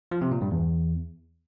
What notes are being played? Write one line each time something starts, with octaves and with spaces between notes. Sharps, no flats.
F3
C3
A#2
G2
E2